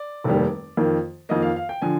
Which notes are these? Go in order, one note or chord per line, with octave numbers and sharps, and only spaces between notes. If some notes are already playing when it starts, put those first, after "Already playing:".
Already playing: D5
F1 D#2 D#3 G3
F2 D#3 A#3
F2 D#3 A#3 D#5
F5
F5
G5
D3 F3 G#5